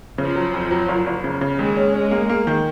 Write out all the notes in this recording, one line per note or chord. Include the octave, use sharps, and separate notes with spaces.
C#3 F3
F#3
F2
F#3
F#1
F#1
C#3
C#3
D#2 G#3
C#4
C#4
A#3
A#3
D#3